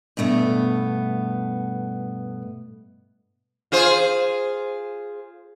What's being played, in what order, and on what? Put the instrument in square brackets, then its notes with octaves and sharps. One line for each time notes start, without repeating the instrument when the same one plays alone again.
[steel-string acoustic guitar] G2 B2 A3 B3
[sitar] F4 G#4 C5